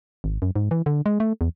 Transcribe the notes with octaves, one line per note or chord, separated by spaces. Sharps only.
G#1
F#2
G#2
E3
D3
G#3
A3
E2